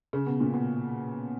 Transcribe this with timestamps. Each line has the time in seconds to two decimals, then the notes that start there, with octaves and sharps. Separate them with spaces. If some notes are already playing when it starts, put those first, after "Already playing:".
0.13 C#3
0.27 B2
0.40 A#2
0.54 B2